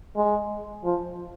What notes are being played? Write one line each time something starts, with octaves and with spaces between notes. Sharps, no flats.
G#3
F3